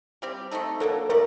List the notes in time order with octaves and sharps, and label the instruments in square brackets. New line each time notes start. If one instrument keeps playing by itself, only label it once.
[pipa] G3 C4 G4
A3 C4 D#4 A4
[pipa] F#3 A#3 D4 [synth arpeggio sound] A4
[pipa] A3 D#4 G4 D5 [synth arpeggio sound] A#4